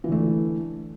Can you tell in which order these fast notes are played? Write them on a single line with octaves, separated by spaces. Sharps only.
E3 D3 A3